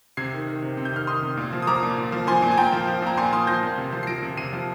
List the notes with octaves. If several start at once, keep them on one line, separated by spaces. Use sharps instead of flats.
C3 G#6 C7
D#3
D#3
C3
C3
G6
D#3 F6
D#3 C6 D#6
C3
A#2
F3
D#6
F3 A#5 D6
A#2
A#2
F3
F3 G#5 C6
A#2
G#5
A#2 G5 A#5
F3
F3
A#2 A#5
A#2 G#5 C6
F3 C6 D#6
F3 G6 A#6
A#2
C3
F3
C7
F3 A#6 D7
C3
C3 C7 D#7
F3